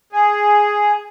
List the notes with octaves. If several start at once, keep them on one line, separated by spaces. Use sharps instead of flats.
G#4